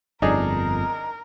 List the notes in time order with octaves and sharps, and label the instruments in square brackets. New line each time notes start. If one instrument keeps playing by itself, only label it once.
[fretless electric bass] G1 F2 [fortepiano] D4 D#4 G#4 [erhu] A#4